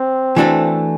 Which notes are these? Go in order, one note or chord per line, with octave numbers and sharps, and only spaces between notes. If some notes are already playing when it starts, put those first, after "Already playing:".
Already playing: C4
E3 A3 D4 F#4 A4